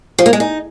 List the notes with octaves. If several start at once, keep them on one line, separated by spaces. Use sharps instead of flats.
F3
A#3
G#3
D#4